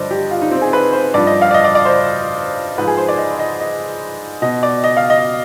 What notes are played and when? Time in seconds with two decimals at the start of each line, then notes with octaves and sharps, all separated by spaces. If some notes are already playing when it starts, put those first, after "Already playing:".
Already playing: G2 D3 F3 C5 D5 D#5
0.11 G4
0.31 F4
0.42 D#4
0.51 C4
0.62 G#4
0.73 B4
0.93 C5
1.14 G2 F3 D5
1.27 D#5
1.41 F5
1.51 D5
1.54 D#5
1.64 D5
1.75 D5
1.85 C5
2.78 G#2 F3 B4
2.87 G#4
2.98 C5
3.09 D5
3.18 D#5
3.39 D#5
3.60 D#5
4.42 B2 D#5
4.63 D5
4.84 D#5
4.97 F5
5.10 D#5